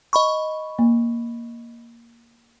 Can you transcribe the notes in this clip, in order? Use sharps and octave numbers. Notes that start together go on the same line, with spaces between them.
D#5 B5 C#6
A#3